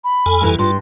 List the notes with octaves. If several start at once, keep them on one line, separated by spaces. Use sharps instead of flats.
B5
F2 A4 G#5
G2 E3
G2 F4 C6